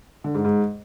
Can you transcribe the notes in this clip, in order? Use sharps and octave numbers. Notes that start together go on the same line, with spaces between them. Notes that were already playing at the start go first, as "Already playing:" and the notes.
D3
G#2
G#2